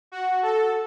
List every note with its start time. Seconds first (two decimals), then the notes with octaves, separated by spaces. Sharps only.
0.12 F#4
0.43 A4